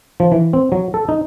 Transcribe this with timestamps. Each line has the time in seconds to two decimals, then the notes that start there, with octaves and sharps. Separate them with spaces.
0.20 F3
0.32 E3
0.53 C4
0.72 F#3
0.94 A4
1.09 D#4